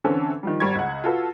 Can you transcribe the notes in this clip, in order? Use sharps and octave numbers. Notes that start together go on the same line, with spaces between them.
D3 E3 C4 C#4 A4
D#3 F3 G3
G#1 G3 C#6 G#6
C#2 F#5
F4 F#4 A4 B4